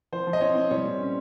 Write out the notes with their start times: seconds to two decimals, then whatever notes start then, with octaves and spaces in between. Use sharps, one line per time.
0.12 F3 C5
0.27 F3
0.33 D#5
0.41 C4 C#5
0.56 C4
0.71 G3 C#5
0.85 A#2
1.00 C#4